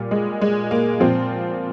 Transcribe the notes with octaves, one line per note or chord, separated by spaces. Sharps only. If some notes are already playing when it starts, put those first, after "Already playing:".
Already playing: A#2 G3
G#3
G#3
A#3
A#2 F3 C4